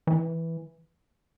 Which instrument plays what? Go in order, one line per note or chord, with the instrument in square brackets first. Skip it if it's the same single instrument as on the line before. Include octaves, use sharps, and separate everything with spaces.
[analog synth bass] E3